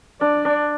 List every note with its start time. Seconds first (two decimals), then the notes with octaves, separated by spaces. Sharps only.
0.21 D4 D5
0.45 D4